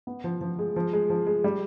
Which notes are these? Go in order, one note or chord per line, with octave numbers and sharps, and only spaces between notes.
B3
F3
F3
G#3
F3
G#3
F3
G#3
G3